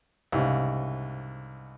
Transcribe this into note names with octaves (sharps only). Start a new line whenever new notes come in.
C2 G#2 C#3